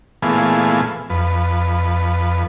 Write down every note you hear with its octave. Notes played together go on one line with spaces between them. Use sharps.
A#2 E3 A3 B3 F4 G#4
F2 B4